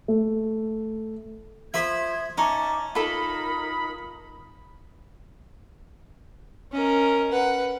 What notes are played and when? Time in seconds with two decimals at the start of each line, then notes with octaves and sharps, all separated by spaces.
0.08 A3
1.74 F4 C5 E5 B5 C6 D#6 G#6
2.38 C#4 D#4 E5 A5 D6
2.95 D#4 F4 A4 A#4 B5 D#6
6.73 C#4 A#4 D#5
7.31 B4 F#5